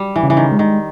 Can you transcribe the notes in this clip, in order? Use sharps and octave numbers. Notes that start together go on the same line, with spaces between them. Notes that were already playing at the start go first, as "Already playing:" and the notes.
Already playing: G3
E3
C#3
E3
D#3
G#3
D#3